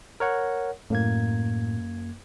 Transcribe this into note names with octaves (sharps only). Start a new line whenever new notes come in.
A#4 C#5 F#5
F#2 A2 A#3 G#6